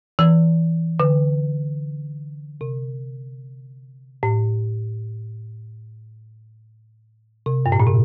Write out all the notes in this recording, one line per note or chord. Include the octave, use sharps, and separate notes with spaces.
E3
D3
C3
A2
C3
G2
A2
A#2
C3